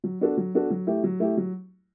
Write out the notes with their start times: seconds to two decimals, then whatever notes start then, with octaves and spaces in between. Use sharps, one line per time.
0.04 F#3
0.21 B3 D4 F#4 A4
0.37 F#3
0.54 B3 D4 F#4 A4
0.70 F#3
0.87 A3 E4 G4
1.04 F#3
1.20 A3 E4 G4
1.37 F#3